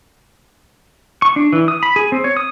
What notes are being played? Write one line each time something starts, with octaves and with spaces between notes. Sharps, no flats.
C#6
D4
E3
D#6
B5
G#4
C4
C#5
D#6